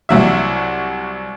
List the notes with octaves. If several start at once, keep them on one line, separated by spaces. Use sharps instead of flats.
C2 F#3 E5